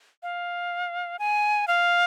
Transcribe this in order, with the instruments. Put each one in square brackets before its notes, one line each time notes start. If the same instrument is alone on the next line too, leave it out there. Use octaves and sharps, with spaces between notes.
[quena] F5
G#5
F5